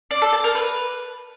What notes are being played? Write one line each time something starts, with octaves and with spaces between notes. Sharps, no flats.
D5
A4
A5
A#4
B4